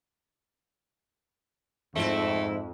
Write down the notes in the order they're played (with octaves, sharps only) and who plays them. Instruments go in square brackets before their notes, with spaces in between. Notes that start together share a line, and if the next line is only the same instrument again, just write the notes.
[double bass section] F2 [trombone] G#2 [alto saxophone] A3 [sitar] C4 E4